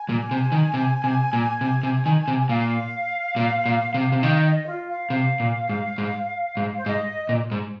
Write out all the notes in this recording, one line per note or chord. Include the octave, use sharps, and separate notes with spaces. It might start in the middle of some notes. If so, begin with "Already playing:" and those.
Already playing: G#5
A#2
C3
D#3
C3
C3
A#2
C3
C3
D#3
C3
G#5
A#2 F5
A#2
A#2
C3
C3
D#3 D#5
D#5
F4
F5
C3 F5
A#2
G#2
G#2
G#2
C5
G#2 D#5
A#2
G#2